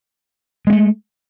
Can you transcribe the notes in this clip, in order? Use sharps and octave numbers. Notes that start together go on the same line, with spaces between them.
G#3 A3 B3